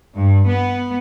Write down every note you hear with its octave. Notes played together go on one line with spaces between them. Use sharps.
G2
B3